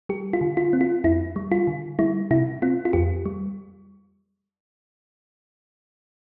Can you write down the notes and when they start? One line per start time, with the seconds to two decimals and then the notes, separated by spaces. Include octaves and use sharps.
0.09 G3 G4
0.33 F4
0.41 D3
0.57 F4
0.73 C4
0.81 F4
1.04 F2 E4
1.36 G3
1.52 F4
1.67 D3
1.99 G3 E4
2.31 C3 E4
2.62 C4 F4
2.85 F4
2.93 F2 G4
3.26 G3